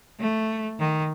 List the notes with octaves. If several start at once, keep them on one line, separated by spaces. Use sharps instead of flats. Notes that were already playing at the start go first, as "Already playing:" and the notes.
A3
D#3